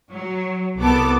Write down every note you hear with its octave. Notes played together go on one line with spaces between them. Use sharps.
F#3
C2 B3 A4 D6